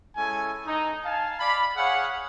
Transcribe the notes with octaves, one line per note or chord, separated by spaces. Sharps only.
G#3 C#4 E4 A4 G#5
D#4
F5 G#5 A5
D5 F5 B5
G#4 C#5 F5 F#5